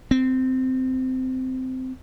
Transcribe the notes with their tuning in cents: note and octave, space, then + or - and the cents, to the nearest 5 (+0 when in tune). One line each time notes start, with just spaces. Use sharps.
C4 -15